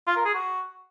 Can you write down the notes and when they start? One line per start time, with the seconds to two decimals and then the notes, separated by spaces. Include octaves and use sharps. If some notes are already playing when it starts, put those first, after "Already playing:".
0.07 F4
0.16 A#4
0.25 G#4
0.34 F#4